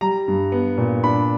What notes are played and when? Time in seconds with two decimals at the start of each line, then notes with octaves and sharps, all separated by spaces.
0.01 G3 A#5
0.28 G2
0.52 B3
0.78 A#2
1.04 D4 B5